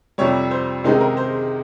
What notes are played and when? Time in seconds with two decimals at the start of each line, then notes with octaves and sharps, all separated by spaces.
0.18 F2 C3 G3 C#5
0.51 C5
0.84 C#2 C3 D#3 G#3 D#4 C5
1.01 A#4
1.17 C5